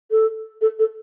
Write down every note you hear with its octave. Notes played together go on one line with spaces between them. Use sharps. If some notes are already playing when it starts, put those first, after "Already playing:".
A4
A4
A4